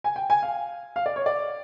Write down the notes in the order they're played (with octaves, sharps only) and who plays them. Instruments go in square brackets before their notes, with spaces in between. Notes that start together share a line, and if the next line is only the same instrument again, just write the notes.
[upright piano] G#5
G5
G#5
F5
F5
D5
C#5
D5